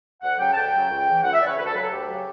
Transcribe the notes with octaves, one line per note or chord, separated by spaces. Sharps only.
D2 F#5
C#3 F#3 G5
A5
D2 G5
C#3 F#3
C#2
C#3 E3
C#2 F#5
E5
C#3 E3 B4 D5
C#5
D2 B4
A4
C#3 F#3 B4
A4
D2 G4
C#3 F#3